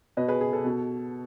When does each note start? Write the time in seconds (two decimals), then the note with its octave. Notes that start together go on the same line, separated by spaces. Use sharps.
0.17 B2 B4 D#5
0.28 G#4 B4
0.41 G#4
0.53 A4
0.65 B2